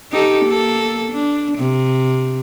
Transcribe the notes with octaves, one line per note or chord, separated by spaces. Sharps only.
D#4 G4 A4
A#3 A4
D4
C3